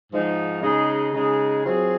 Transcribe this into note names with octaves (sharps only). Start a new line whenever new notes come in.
G#2 F3 G#3 D#4
C#3 G#3 D#4 G#4
C#3 G#3 D#4 G#4
F#3 C4 F4 G#4